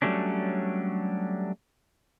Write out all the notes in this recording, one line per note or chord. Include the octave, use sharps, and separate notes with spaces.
F#3 G3 A3 C#4 D4